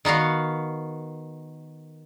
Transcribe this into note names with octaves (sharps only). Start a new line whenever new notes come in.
D#3 B3 F#4 F5